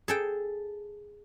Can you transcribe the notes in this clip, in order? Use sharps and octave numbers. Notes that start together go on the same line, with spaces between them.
G#4 A4 G5